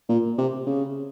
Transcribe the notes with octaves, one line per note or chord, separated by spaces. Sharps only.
A#2
C3
C#3